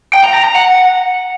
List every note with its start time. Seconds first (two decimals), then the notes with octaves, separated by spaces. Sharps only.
0.13 G5
0.24 A#5
0.34 A#5
0.44 A#5
0.55 F#5